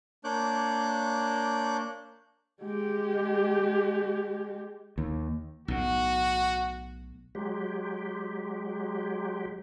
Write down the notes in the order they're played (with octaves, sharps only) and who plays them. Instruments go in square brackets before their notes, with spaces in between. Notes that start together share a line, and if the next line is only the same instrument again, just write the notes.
[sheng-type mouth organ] A#3 D4 C#5 D6 F#6 G6
[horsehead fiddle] G#3 G4
[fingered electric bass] D#2
[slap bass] B1 A2 [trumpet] F#4
[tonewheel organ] F#3 G#3 G4